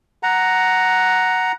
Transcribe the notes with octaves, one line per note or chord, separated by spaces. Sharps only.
F#5 A#5